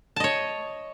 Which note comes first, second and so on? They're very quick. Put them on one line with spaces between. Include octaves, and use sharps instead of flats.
A5 D#5 C#5